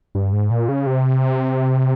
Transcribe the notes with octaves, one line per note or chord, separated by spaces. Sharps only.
G2
G#2
A#2
C#3
C3